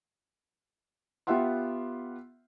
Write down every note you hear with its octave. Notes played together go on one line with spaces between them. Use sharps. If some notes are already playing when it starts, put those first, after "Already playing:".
B3 F4 G4 E5 F#5 C6